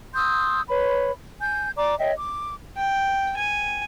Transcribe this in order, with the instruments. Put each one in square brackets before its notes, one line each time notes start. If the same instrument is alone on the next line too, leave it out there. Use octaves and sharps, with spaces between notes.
[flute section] C6 D#6 E6 G6
B4 C#5 B5
G#5 G6
D5 A#5 D6
C#5 D#5 E5 G5
D6
[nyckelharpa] G5
G#5